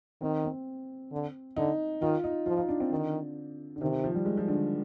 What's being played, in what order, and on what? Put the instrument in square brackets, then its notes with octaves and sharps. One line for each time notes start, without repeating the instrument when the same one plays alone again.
[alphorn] D#3 [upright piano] C4
[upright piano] C4
[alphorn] D3
[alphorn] D3 [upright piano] D#4
[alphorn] D#3 [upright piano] F4
[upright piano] D#4
[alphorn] F3 [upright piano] F4
[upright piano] D#4
D4
C4
[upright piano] D3 [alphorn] D#3
[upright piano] D3
[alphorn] C3 [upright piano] D#3
[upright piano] F3
G3
G#3
F3
D3